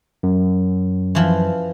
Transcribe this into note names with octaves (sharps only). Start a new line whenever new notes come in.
F#2
E3 F3